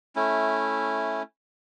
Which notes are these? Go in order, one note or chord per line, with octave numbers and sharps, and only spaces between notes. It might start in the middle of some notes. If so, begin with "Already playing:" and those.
A3 C#4 E4